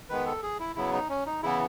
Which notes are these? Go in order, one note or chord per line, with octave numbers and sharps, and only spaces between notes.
D#3 G#3 B3 B4
A4
G#4
E4
C#3 F#3 B3 E4
D#4
C#4
D#4
C#3 E3 B3 E4